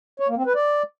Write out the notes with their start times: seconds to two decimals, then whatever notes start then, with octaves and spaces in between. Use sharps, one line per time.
0.20 C#5
0.29 A#3
0.37 C4
0.46 B4
0.55 D5